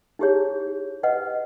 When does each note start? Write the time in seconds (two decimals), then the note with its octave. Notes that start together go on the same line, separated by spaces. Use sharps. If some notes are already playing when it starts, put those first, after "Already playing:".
0.19 D#4 E4 G4 G#4 C#5
1.03 B4 D#5 F#5